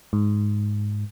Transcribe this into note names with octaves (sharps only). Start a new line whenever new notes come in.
G#2